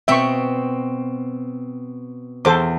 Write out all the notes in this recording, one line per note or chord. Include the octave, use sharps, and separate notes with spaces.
B2 C4 E5 C#6
E2 A4 C5 D6